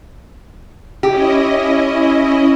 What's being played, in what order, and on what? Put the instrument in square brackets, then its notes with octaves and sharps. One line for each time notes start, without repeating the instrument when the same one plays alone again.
[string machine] C#4 E4 D#5 [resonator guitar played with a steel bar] G4